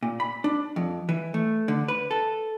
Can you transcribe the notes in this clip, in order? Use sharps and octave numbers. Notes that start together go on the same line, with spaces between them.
A#2
B5
D4
F2
E3
A3
D3
B4
A4